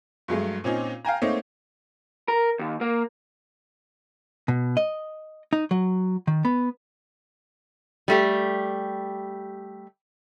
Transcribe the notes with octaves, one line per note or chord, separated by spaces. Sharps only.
G2 F#3 G#3 A3
A#2 C4 C#4 D#4
F5 G5 G#5 A#5
A3 A#3 C4 D#4 C#5
A#4
D#2
A#3
B2
D#5
D#4
F#3
D#3
B3
G3 A3 G4